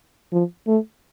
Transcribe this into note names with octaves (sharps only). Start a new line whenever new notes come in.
F3
A3